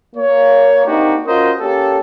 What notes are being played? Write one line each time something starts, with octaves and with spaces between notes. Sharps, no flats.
A#3 C#5
A#3 C4 D4 D#4 F#4 G4
C#4 F4 F#4 A#4 C5 D#5
A#3 C#4 G4 A4